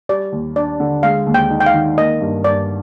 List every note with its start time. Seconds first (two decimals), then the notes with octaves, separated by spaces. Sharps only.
0.09 G3 D5
0.33 D#2
0.56 D4 D5
0.80 D3
1.03 G#3 F5
1.27 D#2
1.34 G5
1.50 D#4
1.60 G5
1.66 F5
1.74 D#3
1.97 A#3 D#5
2.21 G2
2.44 G2 D5